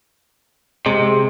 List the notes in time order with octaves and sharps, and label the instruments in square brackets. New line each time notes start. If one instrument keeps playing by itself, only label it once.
[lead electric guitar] C3 [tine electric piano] G#3